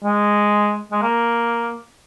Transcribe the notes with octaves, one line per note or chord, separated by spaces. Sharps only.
G#3
G#3
A#3